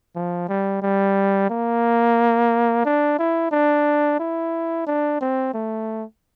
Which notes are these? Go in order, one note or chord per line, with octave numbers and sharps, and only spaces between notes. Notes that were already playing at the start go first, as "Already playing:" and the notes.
F3
G3
G3
A#3
D4
E4
D4
E4
D4
C4
A3